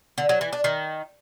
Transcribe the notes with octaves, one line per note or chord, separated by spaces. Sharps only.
D3
F#3
E3
D4
D#3